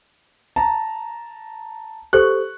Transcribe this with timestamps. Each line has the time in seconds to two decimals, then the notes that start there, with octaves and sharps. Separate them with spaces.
0.56 A5 A#5
2.13 G4 A4 C5 C#6 F#6